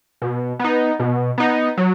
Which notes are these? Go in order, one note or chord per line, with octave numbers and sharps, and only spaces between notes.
B2
B3 D#4
B2
B3 D#4
F#3